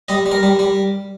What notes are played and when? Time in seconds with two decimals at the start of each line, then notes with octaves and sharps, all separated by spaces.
0.08 G3 D#5
0.26 G3
0.32 A#4
0.43 G3
0.59 G3